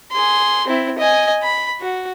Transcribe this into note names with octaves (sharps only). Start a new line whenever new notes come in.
G#4 C6
C4 E4
D#5 G#5
B5
F#4